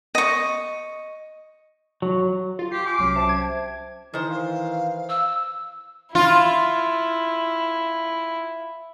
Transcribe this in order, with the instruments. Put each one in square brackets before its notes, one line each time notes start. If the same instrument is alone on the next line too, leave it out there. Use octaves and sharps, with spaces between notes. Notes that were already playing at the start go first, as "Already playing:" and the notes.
[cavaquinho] D#5 C#6
[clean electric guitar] F#3
[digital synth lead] F4
[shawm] G4 [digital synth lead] C7
[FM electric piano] G#5 C6 F6 [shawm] D6
[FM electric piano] C2 F#3 C#4
[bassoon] C3 [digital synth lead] A5
[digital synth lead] G#6
[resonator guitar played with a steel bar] D#3 C5 [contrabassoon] E3
[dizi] F5
[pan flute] E6
[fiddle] E4 [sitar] F4